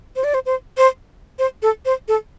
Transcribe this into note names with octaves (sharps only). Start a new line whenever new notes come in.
C5
D5
C5
C5
C5
C5
A4
C5
A4